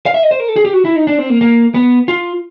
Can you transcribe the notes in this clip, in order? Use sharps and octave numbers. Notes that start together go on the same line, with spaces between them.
F5
E5
D#5
C5
A#4
A4
G#4
G4
F#4
E4
D#4
D4
C4
A#3
A#3
B3
F4